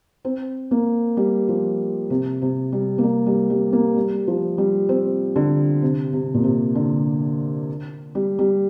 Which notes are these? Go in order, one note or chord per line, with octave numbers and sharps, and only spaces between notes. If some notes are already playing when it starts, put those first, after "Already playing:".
C4
A#3
G3
F3
C3
C3
G3
A#3
G3
G3
G3
A#3
G3
F3
G3
C4
D3
C3
C3
A#2
C3
D3
G3
G3